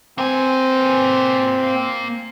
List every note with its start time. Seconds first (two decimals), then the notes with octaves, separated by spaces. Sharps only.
0.18 A#3 C4 G#5